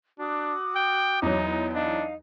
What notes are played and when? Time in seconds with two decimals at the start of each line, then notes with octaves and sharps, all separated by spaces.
0.19 D4 F#4 D6 D#6
0.76 G5
1.22 E2 F#3 D#4
1.73 D4 D#4 F5